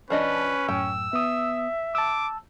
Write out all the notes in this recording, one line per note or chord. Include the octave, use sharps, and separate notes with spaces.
F3 C#4 D4 B4 D#5
F#2 A2 G5 E6
B3 E5 D#6
A5 D6 E6